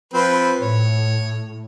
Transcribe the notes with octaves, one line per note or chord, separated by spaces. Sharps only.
F3 C4 B4
A2 C#5